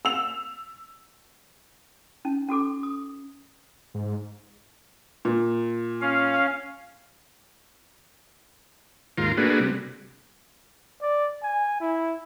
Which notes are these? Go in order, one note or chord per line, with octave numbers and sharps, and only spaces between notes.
E6 F7
C#4 D#4
C#4 F#4 A4 D6
D#6
G#2
A#2
C#4 F5
D#2 G#2 F4 A#4 C6
A3 A#3 D4 F#4 G#4 B4
C3 G3
D5
G#5
E4